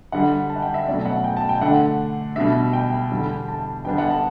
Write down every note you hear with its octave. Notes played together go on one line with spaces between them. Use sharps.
D3 G3 D4 F#5
A5
F#5
G5
E5
B2 F#3 A3 C#4 D5
F#5
G5
A5
G5
D3 A3 D4 F#5
B2 G3 D4 E5
G5
E2 D3 G3 D4
A5
D3 G3 B3 D4 G5
F#5
A5